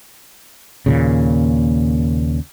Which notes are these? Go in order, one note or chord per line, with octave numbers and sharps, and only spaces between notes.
D#2 A#2 C#3